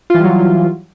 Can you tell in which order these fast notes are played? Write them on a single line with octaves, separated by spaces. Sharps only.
F4 E3 G3 F#3